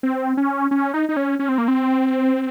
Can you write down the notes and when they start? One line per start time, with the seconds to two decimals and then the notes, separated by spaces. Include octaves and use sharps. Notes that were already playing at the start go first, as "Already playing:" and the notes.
0.03 C4
0.37 C#4
0.71 C#4
0.94 D#4
1.09 D#4
1.17 C#4
1.39 C#4
1.49 C4
1.58 A#3
1.68 C4